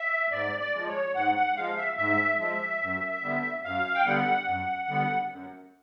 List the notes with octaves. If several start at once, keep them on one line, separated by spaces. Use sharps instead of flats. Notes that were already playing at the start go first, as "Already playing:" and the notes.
Already playing: E5
G#2 D5
D5
F3 G#3
C#5
G#2 F#5
F#5
F3 G#3 F5
E5
G#2 E5
F3 G#3 E5
F#2
D3 G3 B3
F#2 F5
G5
D3 G3 B3 F#5
F#2
D3 G3 B3
F#2